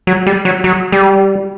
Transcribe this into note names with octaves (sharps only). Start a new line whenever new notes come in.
F#3
G3
F#3
F#3
G3